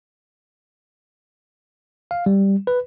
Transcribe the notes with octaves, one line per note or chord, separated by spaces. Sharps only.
F5
G3
B4